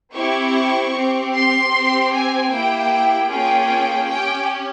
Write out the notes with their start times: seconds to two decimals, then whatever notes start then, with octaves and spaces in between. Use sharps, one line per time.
0.13 C4 E4 G4 C#6
0.93 C4 G4
1.32 C6
1.72 C4 G4
2.11 G#5
2.50 A#3 E4 G4 G5
3.28 A#3 C#4 F4 G#4 G5
4.07 C#4 G4 G5